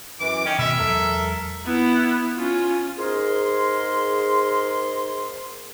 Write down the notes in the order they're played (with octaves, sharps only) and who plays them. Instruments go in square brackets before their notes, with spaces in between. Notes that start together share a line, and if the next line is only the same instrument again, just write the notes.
[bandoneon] F#2 E3 [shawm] D6
[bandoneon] D#3 D#5 G5 [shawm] C#4
[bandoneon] F#2 B5 F6 [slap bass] B2 D#3 G#3 [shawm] E5
[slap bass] E2 F#3 G#3 [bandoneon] A4 A#4
[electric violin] B3 E4
C#4 F4
[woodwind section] G#2 G#4 A#4 C6